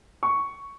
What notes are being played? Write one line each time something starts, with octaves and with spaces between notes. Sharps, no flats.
C#6